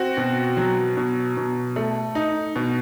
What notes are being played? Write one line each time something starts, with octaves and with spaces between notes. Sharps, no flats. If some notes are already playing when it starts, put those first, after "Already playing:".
Already playing: C4 F#4
B2
F#3
B2
B2
A3
D#4
B2